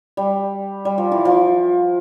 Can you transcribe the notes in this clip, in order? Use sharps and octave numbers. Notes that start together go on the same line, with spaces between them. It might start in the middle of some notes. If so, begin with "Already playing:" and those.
G3
G3
F3
E3
F3